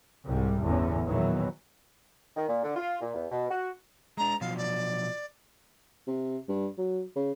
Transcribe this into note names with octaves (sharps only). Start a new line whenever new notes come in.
C2 G#2 G3
G1 E2 A2 D3 C#4
E2 A#2 D#3 E3 F#3 B3
D#3
A#2
D3
F4
A#2
E2
B2
F#4
G#3 D4 A#5
B2 F3 F#3 F5
D5
C3
G2
F#3
C#3